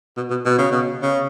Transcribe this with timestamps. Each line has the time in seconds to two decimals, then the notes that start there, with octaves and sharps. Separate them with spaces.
0.17 B2
0.30 B2
0.46 B2
0.59 C#3
0.71 B2
1.02 C#3